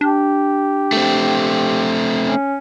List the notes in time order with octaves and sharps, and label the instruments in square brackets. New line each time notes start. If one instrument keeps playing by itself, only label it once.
[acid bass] D4 [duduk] G4
[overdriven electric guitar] A3 C4
[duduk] C#4